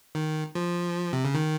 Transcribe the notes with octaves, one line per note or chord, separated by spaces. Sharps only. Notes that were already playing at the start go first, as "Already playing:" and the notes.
D#3
F3
C3
C#3
D#3